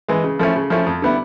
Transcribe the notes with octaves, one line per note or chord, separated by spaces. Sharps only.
E3 G#3
C#3
F3 A3 C#4 E4
C#3
F3 A3 C#4 E4
F2
D3 G3 B3 E4